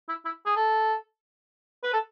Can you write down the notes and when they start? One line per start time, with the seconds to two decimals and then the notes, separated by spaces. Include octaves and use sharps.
0.09 E4
0.25 E4
0.46 G#4
0.56 A4
1.83 B4
1.93 A4